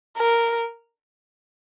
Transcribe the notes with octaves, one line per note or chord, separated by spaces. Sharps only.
A#4